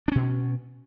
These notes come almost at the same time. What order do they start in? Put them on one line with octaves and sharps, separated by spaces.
D4 C#4 B2